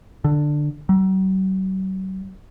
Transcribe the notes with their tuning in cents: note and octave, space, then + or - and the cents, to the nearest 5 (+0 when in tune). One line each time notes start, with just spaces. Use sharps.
D3 +10
F#3 +40